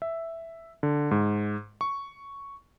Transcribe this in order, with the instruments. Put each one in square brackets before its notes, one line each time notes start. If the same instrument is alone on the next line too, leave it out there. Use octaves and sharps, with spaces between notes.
[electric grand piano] E5
D3
G#2
C#6